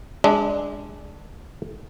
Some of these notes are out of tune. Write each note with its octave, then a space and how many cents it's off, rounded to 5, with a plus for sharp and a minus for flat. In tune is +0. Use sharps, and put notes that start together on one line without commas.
G#3 -5 D4 +0 E5 -45